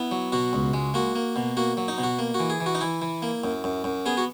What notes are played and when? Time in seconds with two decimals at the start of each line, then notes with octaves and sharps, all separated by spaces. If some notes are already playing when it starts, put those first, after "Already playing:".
Already playing: B3 E4
0.11 F#3
0.32 B2 F#4
0.53 C#2
0.74 G#3
0.94 A#3 F#4
1.15 A#3
1.36 B2
1.57 A#3 F#4
1.77 F#3
1.88 D#4
1.98 B2
2.03 F#4
2.19 A#3
2.34 E3 F#4
2.50 G#4
2.60 E3
2.66 F#4
2.75 D#4
2.81 E3 E4
3.02 E3
3.22 A#3
3.44 F#2
3.64 F#2
3.84 F#2
4.06 B3 G#4
4.17 F#4